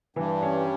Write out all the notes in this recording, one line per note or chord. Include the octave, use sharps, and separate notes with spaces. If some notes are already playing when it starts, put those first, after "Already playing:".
G2 E3
C#4